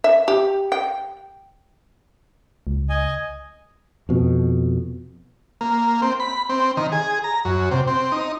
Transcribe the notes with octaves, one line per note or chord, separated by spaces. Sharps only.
E5
G4
G5
C#2
D#5 G#5
F2 B2
A#3
C4
B5
C4
D#3
G#4
A#5
F#2
C3
C4
D#4